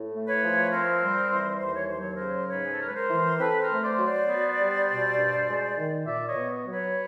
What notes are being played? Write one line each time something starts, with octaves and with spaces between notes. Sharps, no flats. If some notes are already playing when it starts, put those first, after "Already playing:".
Already playing: A2
A3
B4 C#5
F3
C4 A#4 C5
G3
E3
D#2 C5
C#5
F#3 C5
C#5
A#4 C5
C#3
G#2 B4 C#5
G#4
A4
G#3 A#4
B4
A#4 C5
E3
C4 A4 B4
A#4 C5
A3
C5 D5
F#3
C5 D5
B3
G3
B2
G2
G#3
D#3
A#2 D5 E5
C#5 D#5
B3
F#3
B4 C#5